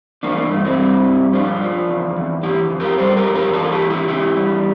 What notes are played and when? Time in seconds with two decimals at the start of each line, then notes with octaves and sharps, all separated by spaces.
0.23 E3 A#3 D4
0.37 A#3
0.50 G2 A3
0.65 C4 E4
0.78 G3
1.06 G2
1.33 F3 D4 F4
1.61 F3
1.88 E2
2.16 E2
2.43 E3 E4 G4
2.70 F2
2.80 G4 A#4
2.98 G3 A4 C5
3.17 G4 A#4
3.25 F2
3.35 G4 A#4
3.53 E3 F4 A4
3.71 E4 G4
3.81 E2
3.90 E4 G4
4.08 E2 E4 G4
4.35 G3